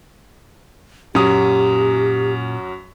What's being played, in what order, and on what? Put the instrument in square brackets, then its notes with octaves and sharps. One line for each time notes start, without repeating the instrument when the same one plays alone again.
[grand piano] F#2 F#3 D#6 [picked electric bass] A#2 C#4 [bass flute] G4